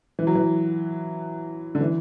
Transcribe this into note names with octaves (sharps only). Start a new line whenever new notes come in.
E3
F#3
E3
D3
E3